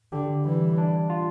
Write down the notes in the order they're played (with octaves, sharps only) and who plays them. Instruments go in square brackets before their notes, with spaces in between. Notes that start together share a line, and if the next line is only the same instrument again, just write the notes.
[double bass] D3 [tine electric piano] G4
[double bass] E3 [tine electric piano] G3
[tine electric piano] D4
F4